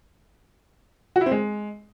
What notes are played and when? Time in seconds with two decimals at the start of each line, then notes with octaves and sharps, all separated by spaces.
1.16 F#4
1.21 E4
1.26 C4
1.32 G#3